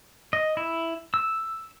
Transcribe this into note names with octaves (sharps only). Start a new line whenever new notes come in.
D#5
E4
E6